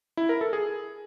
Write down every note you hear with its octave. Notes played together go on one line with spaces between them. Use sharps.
E4
A#4
A4
G#4